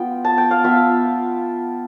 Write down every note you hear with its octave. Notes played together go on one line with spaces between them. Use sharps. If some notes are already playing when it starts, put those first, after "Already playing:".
Already playing: B3 F4 G5
A5
G5
F5
B3 F4 E5